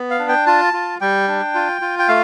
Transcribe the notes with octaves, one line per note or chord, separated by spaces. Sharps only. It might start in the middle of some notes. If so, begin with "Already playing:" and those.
Already playing: B3
F5
D4
G5
F4 A5
F4
G3 G5
D4
F4
F4
G5
A3 F5